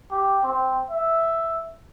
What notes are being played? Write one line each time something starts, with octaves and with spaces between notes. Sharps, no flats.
G4
C4
E5